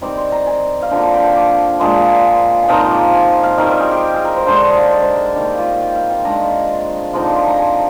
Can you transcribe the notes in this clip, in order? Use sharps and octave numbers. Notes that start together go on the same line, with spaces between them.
D#3 G3 C4 D6
C6
A#5
G#5
F5
D3 F3 A#3 G5
F5
G5
G5
D6
A#2 G#3 D4 C6
G#5
A#2 F3 C4 D#4 A#5
C6
D6
G#5
F5
D#3 G3 C4 A#4
C5
G#4
G4
G#4
A#4
C5
D3 G#3 D4 C5
D#5
F5
D5
C5
A#4
D#3 G3 A#3 G4
F4
G4
F5
G5
D#3 G#3 D4 A#5
D3 F3 C4 D#4 C6
D6
C6
A#5
G#5